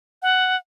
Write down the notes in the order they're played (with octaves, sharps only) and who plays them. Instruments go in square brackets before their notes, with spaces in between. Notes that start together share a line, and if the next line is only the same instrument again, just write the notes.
[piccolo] F#5